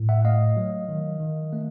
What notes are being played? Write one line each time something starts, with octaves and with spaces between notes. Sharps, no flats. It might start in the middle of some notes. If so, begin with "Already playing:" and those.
Already playing: A2
E5 F#5
A3 D#5 F5
F#3
D#3
D#3
A3